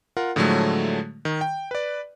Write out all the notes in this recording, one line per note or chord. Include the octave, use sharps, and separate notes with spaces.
F4 A#4 F#5
A2 D3 F3 F#3 G#3 A3
D#3
G5
B4 D5